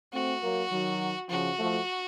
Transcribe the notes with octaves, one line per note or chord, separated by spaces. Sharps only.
A3 C4 F#4
F#3 A#3
D#3 F#3
C#3 F3 F#4
F3 A3